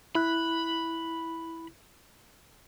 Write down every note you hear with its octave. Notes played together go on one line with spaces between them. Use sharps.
E4 B5 F#6